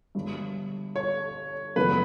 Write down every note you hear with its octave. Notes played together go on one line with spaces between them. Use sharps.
G1 G2 D3
C#5
F#1 E2 C#3 G3 B3 B4